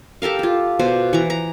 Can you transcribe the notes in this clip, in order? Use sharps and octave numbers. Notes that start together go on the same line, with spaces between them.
G4 A4 A#4 F5
F4 A4
B2 C5 D5
E3 A#5
A#5